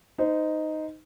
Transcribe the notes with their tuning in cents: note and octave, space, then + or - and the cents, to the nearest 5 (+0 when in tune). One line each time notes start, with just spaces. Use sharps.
D#4 +0 C5 -30